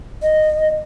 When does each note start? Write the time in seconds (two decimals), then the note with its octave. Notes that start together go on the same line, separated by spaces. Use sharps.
0.23 D#5